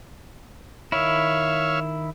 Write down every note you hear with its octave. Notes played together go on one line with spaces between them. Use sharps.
D#3 E4 C#5 E5 F5